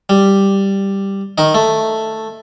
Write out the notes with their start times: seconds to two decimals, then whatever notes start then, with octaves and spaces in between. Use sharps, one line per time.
0.09 G3
1.38 D#3 D#4
1.54 A3